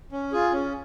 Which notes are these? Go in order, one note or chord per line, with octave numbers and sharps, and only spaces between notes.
C#4
F4 G#4
C#4